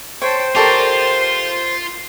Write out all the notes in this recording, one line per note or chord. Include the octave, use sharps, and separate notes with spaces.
C5 C#5 G5 A5
F4 G4 A4 A#4 D5 C#6
C6